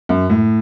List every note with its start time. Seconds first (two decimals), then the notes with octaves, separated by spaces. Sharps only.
0.09 F#2
0.30 A2